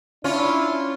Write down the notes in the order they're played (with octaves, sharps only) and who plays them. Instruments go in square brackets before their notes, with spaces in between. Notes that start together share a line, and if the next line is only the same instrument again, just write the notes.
[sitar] C#4 F4 [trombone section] D4 E4